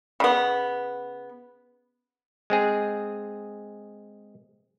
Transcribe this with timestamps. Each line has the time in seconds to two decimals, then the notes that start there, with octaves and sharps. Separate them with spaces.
0.20 C#3 B3
2.50 G#3 C4 G#4